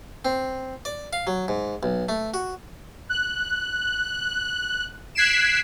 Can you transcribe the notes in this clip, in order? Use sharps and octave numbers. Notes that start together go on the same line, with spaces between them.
C4
D5
F5
F#3
G#2
B1
A3
F#4
F#6
F#6 G#6 B6 C7 D7 E7